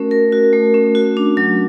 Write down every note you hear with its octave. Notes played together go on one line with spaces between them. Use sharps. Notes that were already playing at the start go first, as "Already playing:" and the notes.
Already playing: A3 C#4 F#4 A#4
A#4
F#4
A3
C#4
F#4
D4
F#3